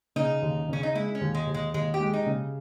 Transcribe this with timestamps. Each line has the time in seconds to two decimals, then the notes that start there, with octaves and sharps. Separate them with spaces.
0.16 C#3 D#4
0.42 D#2
0.68 C#3 C#4
0.83 D#4
0.95 G#3 E4
1.15 C#4
1.21 D#2
1.35 G#3
1.47 D#2
1.54 G#3
1.74 D#2 G#3
1.94 G4
2.00 G#3
2.13 D#4
2.26 C#3